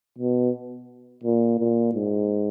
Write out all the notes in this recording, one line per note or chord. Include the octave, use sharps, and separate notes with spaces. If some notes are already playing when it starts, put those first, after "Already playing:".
B2
A#2
A#2
G#2